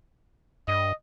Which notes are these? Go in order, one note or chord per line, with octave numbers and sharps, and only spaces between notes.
G2 D#5